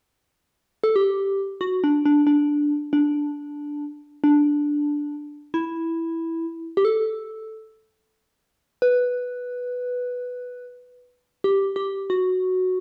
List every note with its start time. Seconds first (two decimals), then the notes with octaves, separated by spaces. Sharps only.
0.84 A4
0.96 G4
1.61 F#4
1.84 D4
2.06 D4
2.27 D4
2.93 D4
4.24 D4
5.54 E4
6.77 G4
6.85 A4
8.82 B4
11.44 G4
11.76 G4
12.10 F#4